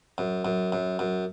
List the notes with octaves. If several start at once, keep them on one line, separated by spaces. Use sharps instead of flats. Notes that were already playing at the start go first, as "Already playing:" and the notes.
F#2
F#2
F#2
F#2